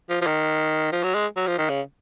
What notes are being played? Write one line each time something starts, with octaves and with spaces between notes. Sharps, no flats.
F3
F3
D#3
F3
F#3
G#3
F#3
F3
D#3
C#3